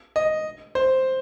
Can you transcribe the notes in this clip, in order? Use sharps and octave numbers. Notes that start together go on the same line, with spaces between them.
D#5
C5